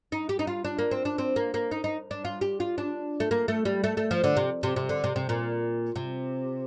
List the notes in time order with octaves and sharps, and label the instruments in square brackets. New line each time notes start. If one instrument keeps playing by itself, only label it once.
[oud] D#4
G4
D#4
F4
D4
A#3
C4
D4
C4
A#3
A#3
D#4
D#4
D4
F4
G4
F4
D4
A3
A#3
A3
G3
A3
A3
F3
D3
C3
C3
C3
D3
C3
C3
A#2
C3